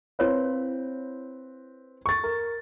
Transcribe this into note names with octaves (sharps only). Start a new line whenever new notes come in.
C4 E4 B4 C#5 F5
C#6 A6
A#4